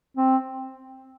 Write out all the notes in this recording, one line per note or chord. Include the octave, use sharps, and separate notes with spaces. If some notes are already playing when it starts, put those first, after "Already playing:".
C4